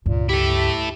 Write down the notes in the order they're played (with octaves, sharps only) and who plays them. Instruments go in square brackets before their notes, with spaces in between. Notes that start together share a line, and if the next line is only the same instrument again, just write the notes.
[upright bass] C#2 G2 [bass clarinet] A#2
[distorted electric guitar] E4 A4 [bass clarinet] G4